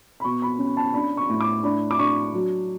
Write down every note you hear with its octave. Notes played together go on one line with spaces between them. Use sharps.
B5
B2 C#6
B5
C#4
A5
D4 B5
C#6
A2
D6
D4 B5
D6
D4 C#6
F#3